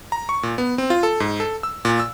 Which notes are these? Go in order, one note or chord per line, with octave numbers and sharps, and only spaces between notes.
A#5
C#6
A#2
B3
C4
F4
A4
G#2
A4
E6
A#2
E6